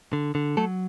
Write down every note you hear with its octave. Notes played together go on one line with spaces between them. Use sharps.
D3
D3
F#3 A3 A4